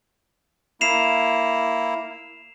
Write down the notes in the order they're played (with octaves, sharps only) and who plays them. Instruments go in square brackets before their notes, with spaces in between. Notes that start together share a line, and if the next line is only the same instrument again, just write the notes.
[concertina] A#3 E4 [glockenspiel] C7 E7 F7